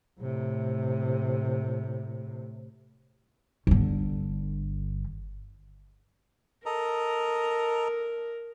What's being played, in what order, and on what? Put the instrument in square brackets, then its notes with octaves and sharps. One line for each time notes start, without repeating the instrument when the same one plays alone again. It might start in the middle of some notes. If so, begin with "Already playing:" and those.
[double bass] A2 C3
[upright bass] G1 D3
[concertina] A4 D#5 A#5 [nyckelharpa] A#4